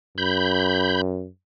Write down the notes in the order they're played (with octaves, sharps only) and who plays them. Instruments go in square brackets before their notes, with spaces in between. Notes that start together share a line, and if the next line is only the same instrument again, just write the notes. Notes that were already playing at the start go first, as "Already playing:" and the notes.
[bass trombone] F#2 [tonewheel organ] B5 G6